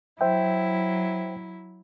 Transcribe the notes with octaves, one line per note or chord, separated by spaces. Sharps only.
F#3 E4 C5 E5 G5